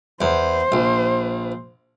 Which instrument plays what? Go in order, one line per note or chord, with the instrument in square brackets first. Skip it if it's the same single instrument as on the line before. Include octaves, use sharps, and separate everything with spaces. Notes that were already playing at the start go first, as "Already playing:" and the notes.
[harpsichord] E2 [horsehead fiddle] C5
[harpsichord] A#1